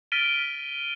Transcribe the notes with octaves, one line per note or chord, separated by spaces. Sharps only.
F6 A6 B6 D7 D#7 G7